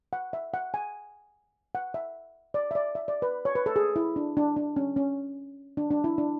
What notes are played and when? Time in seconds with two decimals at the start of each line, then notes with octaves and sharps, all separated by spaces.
0.13 F#5
0.33 E5
0.54 F#5
0.74 G#5
1.75 F#5
1.94 E5
2.54 D5
2.71 E5
2.75 D5
2.95 E5
3.08 D5
3.22 B4
3.45 C#5
3.55 B4
3.66 A4
3.76 G#4
3.96 E4
4.16 D4
4.37 D4
4.56 D4
4.76 C#4
4.96 C#4
5.77 D4
5.91 D4
6.04 E4
6.18 D4